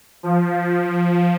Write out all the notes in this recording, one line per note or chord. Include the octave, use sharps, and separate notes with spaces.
F3